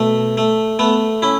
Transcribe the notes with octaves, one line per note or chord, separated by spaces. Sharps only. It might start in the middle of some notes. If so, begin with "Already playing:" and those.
Already playing: B2 A3
A3
A3 B3
C#4 E4